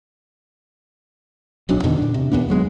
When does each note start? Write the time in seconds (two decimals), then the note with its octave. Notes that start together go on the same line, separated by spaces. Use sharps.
1.69 D1 B1 F#3 D4
1.84 E2 B2 D3 D#3
1.98 A#2 D4
2.14 C3
2.32 D#2 A#2 B3 D4
2.48 D#1 F#3 G#3 B3